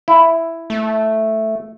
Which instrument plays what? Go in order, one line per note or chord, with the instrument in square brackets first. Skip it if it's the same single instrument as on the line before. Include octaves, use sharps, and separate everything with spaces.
[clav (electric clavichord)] E4
[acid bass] A3